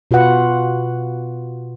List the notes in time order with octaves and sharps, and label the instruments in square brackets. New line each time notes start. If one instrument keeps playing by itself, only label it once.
[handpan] B2 F4 F#4 B4 F#5